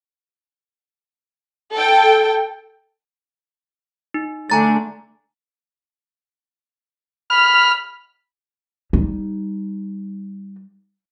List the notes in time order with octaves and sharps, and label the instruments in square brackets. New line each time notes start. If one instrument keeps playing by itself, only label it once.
[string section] A4 G5
[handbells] D#4
[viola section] D3 A3 D4 [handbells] G#5 A#5 A6
[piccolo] B5 [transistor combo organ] F6
[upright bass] G3 D#4